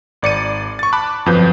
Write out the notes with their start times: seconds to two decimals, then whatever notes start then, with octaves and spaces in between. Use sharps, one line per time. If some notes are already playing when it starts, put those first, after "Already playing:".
0.22 G#1 D5 C#7 D#7
0.79 C#6 A6
0.93 A5 B5 D6 F#6
1.26 G1 F2 F3 F#3 B4 G6